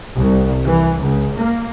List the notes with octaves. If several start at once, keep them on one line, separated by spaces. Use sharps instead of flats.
C2
E3
C#2
A#3